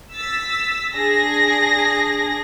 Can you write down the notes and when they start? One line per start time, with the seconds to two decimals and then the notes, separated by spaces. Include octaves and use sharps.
0.14 E6 A6 B6
0.95 D4 G#4 A#6